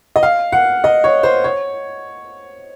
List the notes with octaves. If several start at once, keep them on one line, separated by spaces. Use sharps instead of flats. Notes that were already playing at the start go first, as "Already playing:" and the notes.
D#5
F5
F#5
D#5
C#5
C5
C#5